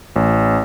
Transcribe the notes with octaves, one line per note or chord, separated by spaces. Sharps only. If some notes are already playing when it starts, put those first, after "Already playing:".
A1